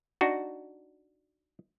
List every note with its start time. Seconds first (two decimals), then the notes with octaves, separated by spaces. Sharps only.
0.21 D4 D#4 F#4